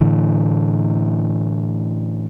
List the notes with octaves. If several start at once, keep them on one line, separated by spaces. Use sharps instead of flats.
A2 D3 E3